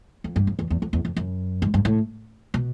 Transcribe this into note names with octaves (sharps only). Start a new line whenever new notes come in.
F2
G2
F2
E2
E2
F2
E2
F2
F#2
G#2
G2
A2
B2